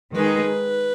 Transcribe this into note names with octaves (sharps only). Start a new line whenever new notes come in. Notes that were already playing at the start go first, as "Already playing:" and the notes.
D#3 G#3 D#4 G#4 B4